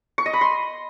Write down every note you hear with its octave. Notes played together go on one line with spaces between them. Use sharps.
C#6
D#5
B5
C6